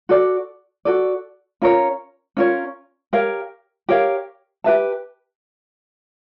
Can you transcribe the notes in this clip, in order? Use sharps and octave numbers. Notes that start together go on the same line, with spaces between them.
F#4 A4 D5
F#4 A4 D5
C#4 F4 A#4 C#5
C#4 F4 A#4 C#5
G4 A#4 C#5 F5
G4 A#4 C#5 F5
G4 B4 E5 A5